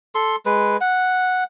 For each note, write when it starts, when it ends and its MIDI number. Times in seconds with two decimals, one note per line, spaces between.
0.15 0.36 69
0.15 0.36 84
0.46 0.77 56
0.46 0.77 71
0.81 1.44 78